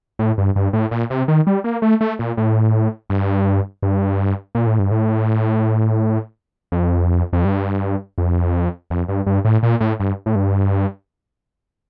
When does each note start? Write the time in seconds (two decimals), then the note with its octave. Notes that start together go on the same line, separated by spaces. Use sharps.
0.19 A2
0.38 G2
0.56 G2
0.73 A2
0.91 A#2
1.10 C3
1.28 D#3
1.47 G3
1.64 A#3
1.82 A3
2.01 A3
2.19 A#2
2.37 A2
3.10 G2
3.83 G2
4.55 A#2
4.67 A2
4.79 G2
4.91 A2
6.72 F2
7.33 F2
7.45 G2
8.18 F2
8.90 F2
9.08 G2
9.27 G2
9.45 A2
9.63 A#2
9.80 A2
10.00 G2
10.26 A2
10.35 G2